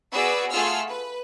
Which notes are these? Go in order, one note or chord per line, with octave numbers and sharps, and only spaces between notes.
B3 F#4 G#4 B4 D5 E6
A3 F4 G#4 F#5 E6 F6
B4